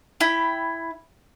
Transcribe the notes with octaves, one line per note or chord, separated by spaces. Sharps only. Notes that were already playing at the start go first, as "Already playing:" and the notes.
E4 G5 B5